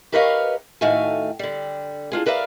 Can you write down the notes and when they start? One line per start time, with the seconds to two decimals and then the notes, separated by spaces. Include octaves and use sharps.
0.12 G4 A#4 B4 C#5 D#5 F5
0.81 A2 D#3 A3 F#4 F5 G#5
1.39 D3 G3
2.12 D4 F4 G#4
2.26 A#4 B4 D5 E5 F5